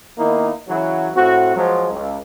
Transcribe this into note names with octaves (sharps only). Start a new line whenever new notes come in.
D#3 A#3 B3 D#4 E4
C#3 E3 F#3
A2 C4 F#4
F3 F#3 G#3
C#2